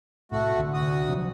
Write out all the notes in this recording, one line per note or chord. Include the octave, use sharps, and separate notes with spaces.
C2 A2 A3 F#4
C2 D3
D2 F#4 D#6
C3 F3 F#3